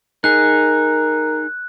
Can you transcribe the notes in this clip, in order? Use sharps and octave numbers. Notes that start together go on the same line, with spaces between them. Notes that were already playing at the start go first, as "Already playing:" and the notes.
D#4 G#4 A#4 F#6